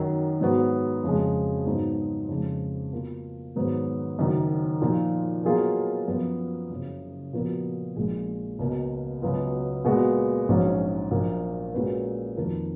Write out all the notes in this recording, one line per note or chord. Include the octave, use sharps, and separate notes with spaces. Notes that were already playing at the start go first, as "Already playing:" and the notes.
Already playing: F#2 D#3 F#3
G#2 F#3 B3 F#4
F2 C#3 G#3
G#2 F#3 B3 D#4 F#4
F2 C#3 G#3
B2 A#3 F4
G#2 D#3 F#3 B3
F#1 F#2 D#3 F#3
A#2 F3 A#3 D#4
B2 F#3 A#3 F4 G#4
F#2 F3 B3
F#1 F#2 C#3
A#2 F3 B3 F#4 A#4
A#1 A#2 G#3
C#2 B2 A#3
C#2 B2 F#3 B3 F4
A#2 G#3 B3 F#4 B4
A#1 G#2 F#3 C#4
A#1 A#2 F#3 A#3
A#2 G#3 C#4 F#4 B4
F2 D#3 A#3 F4 A#4